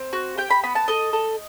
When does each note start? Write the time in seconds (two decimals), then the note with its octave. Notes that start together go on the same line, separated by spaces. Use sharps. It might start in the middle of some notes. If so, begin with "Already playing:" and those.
Already playing: C4
0.13 F#4
0.37 G4 G5
0.50 B5
0.63 B3 B5
0.75 A5
0.88 A4 D#5
1.13 A4